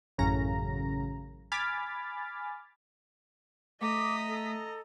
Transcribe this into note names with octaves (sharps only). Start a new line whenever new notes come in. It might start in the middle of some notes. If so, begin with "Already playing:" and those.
A1 F#2 C#3 A#5
G#5 B5 D6 F6 A6
A3 D#5 A#5 D6 D#6 B6
A4